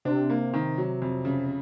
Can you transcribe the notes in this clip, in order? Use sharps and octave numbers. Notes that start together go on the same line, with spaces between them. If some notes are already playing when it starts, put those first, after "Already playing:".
C3 D4
A#3
D#3
F#3
F2
C#3